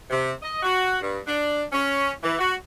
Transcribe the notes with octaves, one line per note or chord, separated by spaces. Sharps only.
C3
D#5
F#4
G2
D4
C#4
E3
F#4